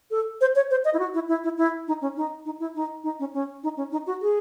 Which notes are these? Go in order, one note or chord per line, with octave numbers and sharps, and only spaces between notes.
A4
C5
C#5
C5
D#5
E4
F#4
E4
E4
E4
E4
D#4
C#4
D#4
D#4
E4
D#4
D#4
C#4
C#4
D#4
C#4
D#4
F#4
G#4